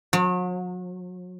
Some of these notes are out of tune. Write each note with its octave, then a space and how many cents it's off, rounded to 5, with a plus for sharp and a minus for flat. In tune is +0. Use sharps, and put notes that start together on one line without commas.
F#3 -40